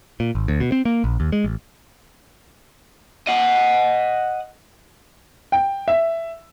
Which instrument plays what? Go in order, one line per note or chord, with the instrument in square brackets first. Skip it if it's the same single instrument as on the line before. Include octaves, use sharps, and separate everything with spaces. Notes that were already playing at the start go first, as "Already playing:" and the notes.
[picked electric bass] A#2
G#1
D2
B2
C4
A#3
A#1
D#2
G#3
A1
[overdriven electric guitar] D#5 F#5
[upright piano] G5
E5